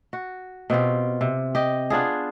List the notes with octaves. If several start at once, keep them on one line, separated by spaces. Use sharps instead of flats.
F#4
B2 C4 F4 G4
C3
G4 D#5
B3 D4 F4 G#4